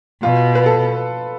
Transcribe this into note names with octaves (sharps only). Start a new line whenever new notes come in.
B2 F4
B4
A4